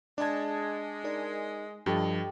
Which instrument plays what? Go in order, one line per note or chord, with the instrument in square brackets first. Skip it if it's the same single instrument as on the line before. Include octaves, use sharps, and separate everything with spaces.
[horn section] G#3 [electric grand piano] D4 A5 [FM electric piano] D5 G#5 G#6
[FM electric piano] D#4 A#4 D5
[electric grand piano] G2 [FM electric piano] F3 [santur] G4 A4 D#5